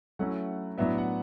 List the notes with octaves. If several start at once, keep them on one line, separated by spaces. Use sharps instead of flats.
F#3 A3 C#4 E4 F#5
A2 F#3 B3 D4 E5
F#5